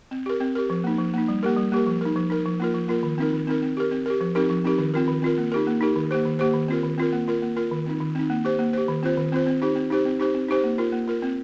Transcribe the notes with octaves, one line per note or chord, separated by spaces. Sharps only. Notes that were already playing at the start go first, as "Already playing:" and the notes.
C4
G4 A#4
C4
G4 A#4
F3
A#3 D#4
F3
A#3 D#4
G3
A#3 G4 A#4
G3
A#3 G4 A#4
F3
D#4 A#4
F3
D#4 A#4
F3
A#3 F4 A#4
F3
A#3 F4 A#4
D#3
C4 D#4 A#4
D#3
C4 D#4 A#4
C4
G4 A#4
C4
G4 A#4
F3
C4 D#4 G4 A#4
F3
C4 D#4 G4 A#4
D#3
C4 F4 A#4
D#3
C4 F4 A#4
A#3
D#4 G4 A#4
A#3
D#4 G4 A#4
D#3
A#3 G4 C5
D#3
A#3 G4 C5
D#3
C4 F4 A#4
D#3
C4 F4 A#4
A#3
F4 A#4
A#3
F4 A#4
D#3
C4 D#4
D#3
C4 D#4
A#3
G4 C5
A#3
G4 C5
D#3
C4 F4 C5
D#3
C4 F4 C5
C4
D#4 G4 C5
C4
D#4 G4 C5
C4
D#4 G4 C5
C4
D#4 G4 C5
A#3
F4 A#4
A#3
F4 A#4
C4